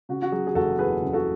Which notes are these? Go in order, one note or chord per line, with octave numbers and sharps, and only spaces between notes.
C#3 F#4
F#4
F#3 G#4
G#4
F#1 F#4 A4
E2 G#4 B4
C#3
F#4 A4